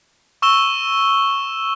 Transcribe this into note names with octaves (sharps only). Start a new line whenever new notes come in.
C#6 E6 E7 G7